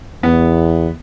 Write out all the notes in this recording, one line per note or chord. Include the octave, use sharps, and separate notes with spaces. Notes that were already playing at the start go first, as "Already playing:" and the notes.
E2 B3